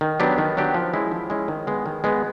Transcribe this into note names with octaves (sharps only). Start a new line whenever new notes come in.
D#3
F#3 B3 D4 G4
D#3
F#3 B3 D4 G4
F3
G#3 C#4 E4
F3
G#3 C#4 E4
D#3
G#3 B3
D#3
G#3 B3